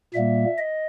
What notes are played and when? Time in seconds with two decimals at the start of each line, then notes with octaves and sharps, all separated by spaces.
0.14 A#2 G3 A#3 E5
0.58 D#5